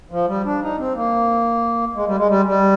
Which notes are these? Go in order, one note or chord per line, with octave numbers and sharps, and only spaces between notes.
F3
G3
D4
D#4
C4
A#3
G#3
G3
G#3
G3
G3